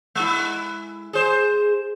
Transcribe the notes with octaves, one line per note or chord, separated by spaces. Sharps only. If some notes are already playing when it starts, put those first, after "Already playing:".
G#3 E4
G#4 C5